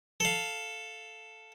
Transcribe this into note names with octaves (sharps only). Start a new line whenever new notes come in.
A4 F5